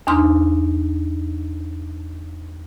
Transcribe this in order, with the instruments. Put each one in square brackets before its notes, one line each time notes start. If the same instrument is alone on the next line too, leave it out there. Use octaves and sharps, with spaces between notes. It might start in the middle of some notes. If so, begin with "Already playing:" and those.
[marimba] E2 D4 D#4 C6 F6